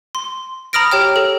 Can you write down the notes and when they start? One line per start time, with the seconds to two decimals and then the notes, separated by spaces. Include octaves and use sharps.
0.15 C6
0.73 A#5 B5 D#6 F6 A#6 D7
0.91 G4 C#5 G5 F6
1.16 A4